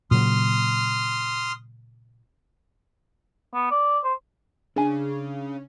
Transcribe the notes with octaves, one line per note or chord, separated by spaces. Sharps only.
A#2 C#3 F#3 C6 D#6 F6
B3
D5
C5
C#3 D4 G#5